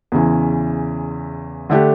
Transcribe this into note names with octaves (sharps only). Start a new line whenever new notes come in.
E2 C#3 E3
D3 A3 D4 G4